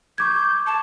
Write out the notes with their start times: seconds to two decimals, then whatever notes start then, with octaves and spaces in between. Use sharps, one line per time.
0.18 C#6 D6 G6 G#6
0.67 A5